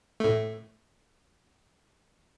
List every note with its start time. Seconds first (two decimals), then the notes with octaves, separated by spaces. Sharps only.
0.20 A2 A3